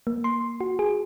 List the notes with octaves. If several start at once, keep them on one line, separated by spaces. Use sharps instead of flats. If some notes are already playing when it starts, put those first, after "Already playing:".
A#3
C6
F#4
G#4